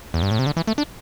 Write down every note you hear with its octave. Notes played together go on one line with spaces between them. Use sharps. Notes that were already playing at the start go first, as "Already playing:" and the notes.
E2
G2
A2
C3
D3
E3
A3
D4